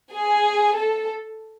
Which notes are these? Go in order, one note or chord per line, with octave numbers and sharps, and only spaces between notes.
G#4
A4